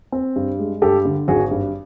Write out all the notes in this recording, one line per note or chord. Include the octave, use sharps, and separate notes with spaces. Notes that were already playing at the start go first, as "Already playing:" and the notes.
C4
G2
G#3
G2 G4 A4
D3
G#1 F#4 G#4
G2